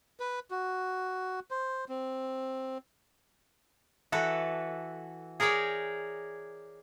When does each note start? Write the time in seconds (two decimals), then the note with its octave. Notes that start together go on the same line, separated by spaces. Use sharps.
0.20 B4
0.51 F#4
1.51 C5
1.89 C4
4.12 E3 F#4 A4 B4
5.40 G#4 A#4 C#5 D5 G5